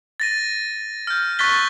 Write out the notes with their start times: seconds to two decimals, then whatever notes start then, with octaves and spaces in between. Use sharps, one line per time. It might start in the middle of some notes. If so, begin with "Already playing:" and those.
0.20 A6 A#6 D#7
1.07 F6 G6
1.39 C#6 E6 F#6 A6 B6 G7